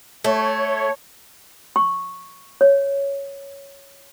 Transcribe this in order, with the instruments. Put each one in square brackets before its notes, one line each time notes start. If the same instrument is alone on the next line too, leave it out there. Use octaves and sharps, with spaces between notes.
[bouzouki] A3 [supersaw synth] C#5
[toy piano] C#6
C#5